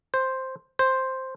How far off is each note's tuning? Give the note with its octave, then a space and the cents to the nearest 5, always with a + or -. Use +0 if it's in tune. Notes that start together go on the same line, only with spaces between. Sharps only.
C5 +0
C5 +0